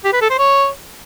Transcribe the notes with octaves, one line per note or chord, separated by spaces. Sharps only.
G4
B4
A4
C5
C#5